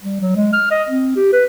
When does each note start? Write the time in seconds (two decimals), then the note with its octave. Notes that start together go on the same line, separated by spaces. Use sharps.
0.02 G3
0.21 F#3
0.36 G#3
0.53 F6
0.71 D#5
0.88 C4
1.16 G4
1.32 B4